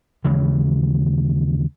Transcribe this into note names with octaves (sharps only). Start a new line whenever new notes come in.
D#2 C#3 E3 G#3